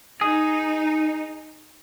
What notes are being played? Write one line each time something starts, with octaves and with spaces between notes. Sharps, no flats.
D#4 G#4